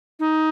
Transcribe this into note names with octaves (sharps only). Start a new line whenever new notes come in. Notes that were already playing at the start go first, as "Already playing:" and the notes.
D#4